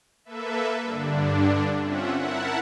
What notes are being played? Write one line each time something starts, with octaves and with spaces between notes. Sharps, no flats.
A#3 A4 B4 E5
G2 D3 D4
C4 C#4 F4 E5 F#5
E4 A#4 E5 F#5 A5